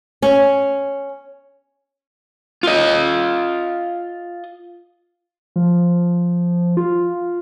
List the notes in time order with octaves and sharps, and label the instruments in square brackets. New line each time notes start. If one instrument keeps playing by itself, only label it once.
[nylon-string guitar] C#4
[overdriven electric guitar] F4 D#5
[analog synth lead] F3
F4